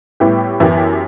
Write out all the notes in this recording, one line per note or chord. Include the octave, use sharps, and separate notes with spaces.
A2 G3 B3 E4 G4
F#2 E3 B3 E4 G4